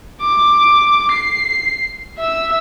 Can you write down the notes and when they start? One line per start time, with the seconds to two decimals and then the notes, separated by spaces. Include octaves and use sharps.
0.22 D6
1.12 C7
2.18 E5 E6